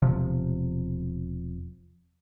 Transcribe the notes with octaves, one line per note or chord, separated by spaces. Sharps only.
E1 C3 F3